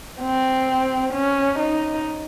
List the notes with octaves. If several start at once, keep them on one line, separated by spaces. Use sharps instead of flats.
C4
C#4
D#4